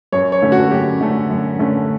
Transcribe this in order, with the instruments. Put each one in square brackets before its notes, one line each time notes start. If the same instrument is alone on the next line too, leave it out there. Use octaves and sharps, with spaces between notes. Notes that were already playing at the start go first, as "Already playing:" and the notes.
[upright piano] F#2 C#5
C#5
D3 A3 C#4
F#4
F#2 G4
D3 A3 C#4
F#2
D3 A3 C#4